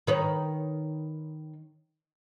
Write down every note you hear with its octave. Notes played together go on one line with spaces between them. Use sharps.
D#3 B4 C#5